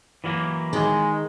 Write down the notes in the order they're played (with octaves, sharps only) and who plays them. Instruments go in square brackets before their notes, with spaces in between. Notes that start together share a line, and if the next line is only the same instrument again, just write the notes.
[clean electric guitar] E3 F#3 A#3
[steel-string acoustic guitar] D#3 [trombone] G#3